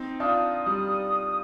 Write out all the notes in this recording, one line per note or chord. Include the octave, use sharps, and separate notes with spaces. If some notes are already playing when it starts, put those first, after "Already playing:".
Already playing: C4 D#4
D4 F4 D#6
G3